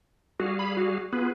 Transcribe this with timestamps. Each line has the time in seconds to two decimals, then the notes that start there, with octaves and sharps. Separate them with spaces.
0.40 G3 F#4 G#4 F5
0.59 B5
0.77 F#4
1.13 B3 F4 G#4 B4